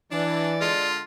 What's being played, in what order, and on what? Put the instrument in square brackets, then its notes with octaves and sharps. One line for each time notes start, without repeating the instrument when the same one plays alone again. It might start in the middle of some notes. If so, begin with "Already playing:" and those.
[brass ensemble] E3 [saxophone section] D4 [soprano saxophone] D5
[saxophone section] D3 G#3 [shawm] F4